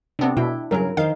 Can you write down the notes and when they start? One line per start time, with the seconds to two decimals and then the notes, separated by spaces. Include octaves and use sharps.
0.19 C3 B3 C4 D4
0.37 B2 E4 G5
0.71 G2 C#3 F#3 G#4 A#4
0.97 D#3 D#4 C5 F5